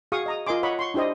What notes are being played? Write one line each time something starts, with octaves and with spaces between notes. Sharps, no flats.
F#4 G#4 F5 C#6 D#6
D#5 A#5 D#6
F4 A#4 D#5 G#5 C6 D6
C#5 D#5 F#5 A#5 B5 C#6
C6 C#6
D4 E4 G4 C5 D#5